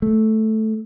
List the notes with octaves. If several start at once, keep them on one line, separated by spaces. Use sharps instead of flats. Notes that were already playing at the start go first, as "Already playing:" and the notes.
A3